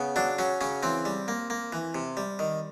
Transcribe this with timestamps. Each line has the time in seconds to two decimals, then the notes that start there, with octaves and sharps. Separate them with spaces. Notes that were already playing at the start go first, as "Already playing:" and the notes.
Already playing: C#3 B3
0.16 F#3 D4
0.38 F#3 C#4
0.61 C#3 C#4
0.83 E3 C4
1.05 G3
1.28 A#3
1.50 A#3
1.72 E3
1.95 C3
2.17 G3
2.39 D#3